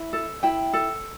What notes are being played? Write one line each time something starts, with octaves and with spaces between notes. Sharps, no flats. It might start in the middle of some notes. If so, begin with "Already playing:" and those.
Already playing: E4
A4
E4 G5
A4